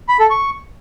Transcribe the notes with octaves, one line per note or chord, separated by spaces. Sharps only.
B5
A4
C#6